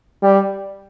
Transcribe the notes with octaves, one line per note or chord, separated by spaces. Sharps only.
G3